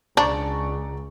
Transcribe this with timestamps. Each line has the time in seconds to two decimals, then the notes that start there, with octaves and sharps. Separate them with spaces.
0.17 C#2 D4 D5 A#5 C#6